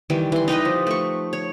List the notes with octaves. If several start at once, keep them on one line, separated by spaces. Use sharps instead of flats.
D#3 E3 G3
E3 C6
D#4 G4 B4 D#5
F3
A3 C#6
C#5